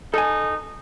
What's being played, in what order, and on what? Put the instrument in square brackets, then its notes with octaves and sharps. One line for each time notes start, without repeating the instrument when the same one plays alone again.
[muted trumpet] D#4 [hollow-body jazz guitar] A4 G#5